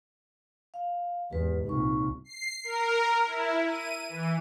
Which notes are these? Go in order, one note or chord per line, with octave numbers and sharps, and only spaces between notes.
F5
E2 G#2 G4 B4
C2 A#2 D#4 C#6
C7
A#4
E4
D#7
E3